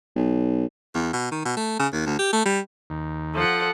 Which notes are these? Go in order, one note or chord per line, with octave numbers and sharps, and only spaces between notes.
B1
E2
B2
D#3
B2
A3
C#3
D#2
D2
G4
A3
G3
D#2
F3 A4 F#5